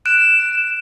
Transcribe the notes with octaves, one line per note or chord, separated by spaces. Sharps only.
F#6 D7 E7